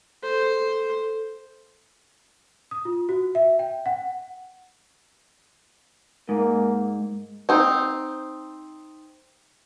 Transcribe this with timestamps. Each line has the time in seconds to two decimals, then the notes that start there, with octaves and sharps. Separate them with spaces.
0.23 A4 C5
2.71 D#6
2.85 F4
3.09 F#4
3.35 E5
3.59 G5
3.86 F#5
6.29 G#2 A#3
7.49 C4 D#4